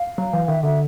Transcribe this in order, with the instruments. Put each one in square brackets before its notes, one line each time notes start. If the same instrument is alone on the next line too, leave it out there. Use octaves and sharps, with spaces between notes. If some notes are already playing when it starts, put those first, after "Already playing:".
Already playing: [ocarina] F5
[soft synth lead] F#3
E3
[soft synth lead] D#3 [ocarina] E5
[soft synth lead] D3 [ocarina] E5